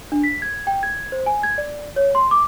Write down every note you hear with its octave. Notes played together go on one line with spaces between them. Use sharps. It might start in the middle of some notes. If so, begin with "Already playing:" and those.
D4
B6
G#6
G5
G#6
C5
G#5
G#6
D5
C#5
C6
D6